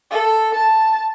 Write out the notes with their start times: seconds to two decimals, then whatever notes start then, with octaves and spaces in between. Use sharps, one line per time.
0.11 A4
0.55 A5